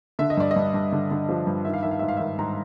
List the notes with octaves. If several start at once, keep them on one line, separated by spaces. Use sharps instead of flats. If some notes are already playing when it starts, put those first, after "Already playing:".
D3 E5
D#5
G2 D5
D#5
G2
G2
D3
D3
F3
G2
D#3 E5
F5
D#3 E5
F5
G#2 E5
F5
E5
D#3
G#2 A#5